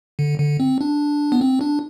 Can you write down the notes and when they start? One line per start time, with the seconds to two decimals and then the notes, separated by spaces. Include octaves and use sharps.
0.19 D3
0.40 D3
0.60 C4
0.81 D4
1.32 B3
1.41 C4
1.61 D4